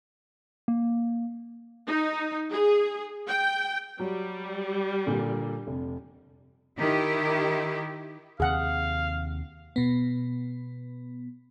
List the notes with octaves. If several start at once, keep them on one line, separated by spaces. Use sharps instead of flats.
A#3
D#4
G#4
G5
F#3 G3
A#2 D3
F1
D#3 E4 G4
D#2 C3 G#4 F5 F#5
B2 B3